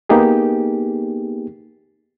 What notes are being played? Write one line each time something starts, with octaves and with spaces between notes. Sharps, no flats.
A#3 B3 D#4 G4 G#4